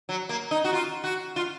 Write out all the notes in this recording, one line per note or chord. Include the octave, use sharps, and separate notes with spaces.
F#3
A#3
D#4
F#4
F4
F#4
F4